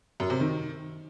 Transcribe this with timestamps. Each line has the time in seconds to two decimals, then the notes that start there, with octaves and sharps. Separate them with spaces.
0.20 F#2
0.30 C3
0.40 D#3